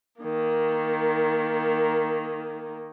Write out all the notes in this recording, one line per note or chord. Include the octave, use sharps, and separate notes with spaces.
D#3 A#3